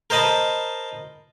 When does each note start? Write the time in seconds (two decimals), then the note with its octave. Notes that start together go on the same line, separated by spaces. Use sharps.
0.10 A#4 C5 D#5 A5 B5